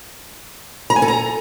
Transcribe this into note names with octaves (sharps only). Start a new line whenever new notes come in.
A#5
G#5
A4
A#5